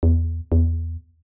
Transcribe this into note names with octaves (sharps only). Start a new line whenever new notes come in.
E2
E2